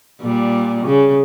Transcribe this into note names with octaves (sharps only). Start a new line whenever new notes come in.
A#2 G3
C#3